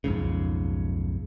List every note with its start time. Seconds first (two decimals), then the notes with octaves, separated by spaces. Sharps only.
0.04 B1 F2 G#2 C#3